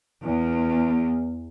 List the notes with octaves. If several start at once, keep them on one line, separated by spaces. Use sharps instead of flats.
E2